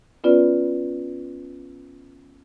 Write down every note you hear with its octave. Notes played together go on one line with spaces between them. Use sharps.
B3 C#4 F4 B4 D5